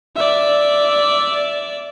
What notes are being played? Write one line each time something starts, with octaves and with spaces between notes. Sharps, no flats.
D5 E5